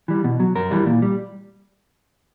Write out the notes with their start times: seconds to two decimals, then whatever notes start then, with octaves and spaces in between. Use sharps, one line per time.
0.08 E3 G3
0.24 B2
0.40 F#3
0.55 F#2 A#4
0.71 E3 G3
0.86 A#2
1.02 G3